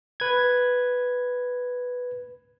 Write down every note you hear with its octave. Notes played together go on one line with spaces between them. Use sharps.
B4 G#6